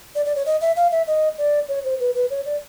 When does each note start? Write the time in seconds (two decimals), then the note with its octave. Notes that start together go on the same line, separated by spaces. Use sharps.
0.15 D5
0.25 D5
0.36 C#5
0.46 D#5
0.61 E5
0.76 F5
0.91 E5
1.07 D#5
1.38 D5
1.69 C#5
1.84 C5
2.00 B4
2.15 B4
2.30 C#5
2.45 D5